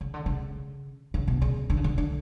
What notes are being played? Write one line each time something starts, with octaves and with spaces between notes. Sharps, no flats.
C#3
D3
C#3
C#3
B2
C#3
D3
C#3
D3
D3